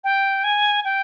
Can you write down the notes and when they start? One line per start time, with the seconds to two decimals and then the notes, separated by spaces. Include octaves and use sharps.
0.04 G5
0.44 G#5
0.85 G5